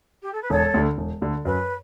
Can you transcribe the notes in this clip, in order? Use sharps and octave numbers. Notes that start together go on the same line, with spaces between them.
G4
A4
B4
E1 A4 C#5
D2 D3
E1
D2 D3
F#2 B4